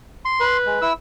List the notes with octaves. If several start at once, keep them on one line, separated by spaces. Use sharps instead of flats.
C6
B4
G#3
E4 E6